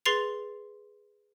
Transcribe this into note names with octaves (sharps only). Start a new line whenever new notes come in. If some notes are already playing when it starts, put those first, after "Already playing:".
G#4 B4 C6 A6 C7 F7